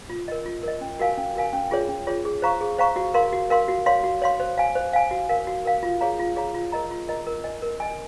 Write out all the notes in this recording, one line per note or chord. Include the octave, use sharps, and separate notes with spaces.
F4
A#4 D#5
F4
A#4 D#5
C#4
F#4 A#4 F5 G#5
C#4
F#4 A#4 F5 G#5
C#4
F4 G#4 C#5
C#4
F4 G#4 C#5
G#4
C5 F5 A#5 C#6
G#4
C5 F5 A#5 C#6
F#4
A#4 F5 C6
F#4
A#4 F5 C6
F#4
C#5 F5 C6
F#4
C#5 F5 C6
C5
F5 G#5
C5
F5 G#5
F#4
A#4 F5
F#4
A#4 F5
F4
G#4 C#5 F5 A#5
F4
G#4 C#5 F5 A#5
F4
A#4 D#5 A#5
F4
A#4 D#5 A#5
A#4
D#5 G#5
A#4
D#5 G#5